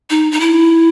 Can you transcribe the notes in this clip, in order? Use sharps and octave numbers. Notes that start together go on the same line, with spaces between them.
D#4
D#4
E4